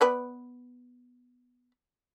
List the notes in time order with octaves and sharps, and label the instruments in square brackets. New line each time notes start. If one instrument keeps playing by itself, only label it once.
[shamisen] B3 B4 D5